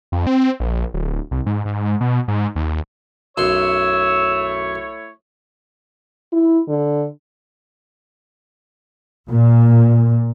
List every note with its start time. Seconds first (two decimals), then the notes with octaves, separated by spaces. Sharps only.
0.12 F2
0.27 C4
0.60 A#1
0.94 D1
1.31 C2
1.46 G#2
1.65 G#2
2.01 B2
2.28 G#2
2.56 D#2
3.38 B1 F#2 A3 E4 C#5 C6 E6
6.33 E4
6.68 D3
9.29 A#2